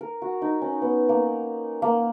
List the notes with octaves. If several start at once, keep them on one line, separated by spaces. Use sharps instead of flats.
A#4
F#4
D#4
C#4
B3
A#3
A#3